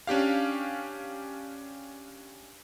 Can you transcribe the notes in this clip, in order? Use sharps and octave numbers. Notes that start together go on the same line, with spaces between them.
C#4 D4 G4 F5